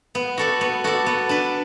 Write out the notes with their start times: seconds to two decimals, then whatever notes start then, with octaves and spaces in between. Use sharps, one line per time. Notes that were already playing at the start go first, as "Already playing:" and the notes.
0.15 B3
0.37 F#4 A4 D5
0.61 B3
0.84 F#4 A4 D5
1.06 B3
1.29 D4 B4